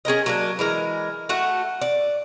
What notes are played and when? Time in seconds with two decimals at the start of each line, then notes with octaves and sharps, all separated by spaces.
0.05 C#4 G#4 A#4 D#5
0.26 F#3 A#3 D4
0.59 E3 G#3 A#4
1.29 A3 F#4 F#5
1.81 D5